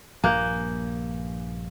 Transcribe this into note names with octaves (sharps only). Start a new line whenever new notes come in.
A#1 G2 A#3 G#5 F#6 G6